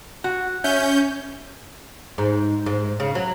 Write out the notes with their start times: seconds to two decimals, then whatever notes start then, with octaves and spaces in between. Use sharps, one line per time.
0.24 F#4
0.64 C#4 E5 G6
2.18 G#2
2.66 G#2
3.00 C#3
3.15 F#3